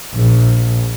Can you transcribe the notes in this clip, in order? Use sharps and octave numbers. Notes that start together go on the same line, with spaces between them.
A#1